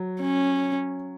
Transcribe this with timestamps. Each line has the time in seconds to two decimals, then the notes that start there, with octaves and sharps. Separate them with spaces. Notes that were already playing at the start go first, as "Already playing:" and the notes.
Already playing: F#3
0.21 C#4